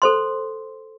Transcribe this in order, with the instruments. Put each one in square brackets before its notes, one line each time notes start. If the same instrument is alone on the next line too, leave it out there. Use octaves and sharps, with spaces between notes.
[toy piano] A4 C5 C6